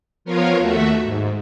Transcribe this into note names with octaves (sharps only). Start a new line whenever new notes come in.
F3 B3 F4 A#4 C#5 F5
D#2 A3 F#4 E5
G#2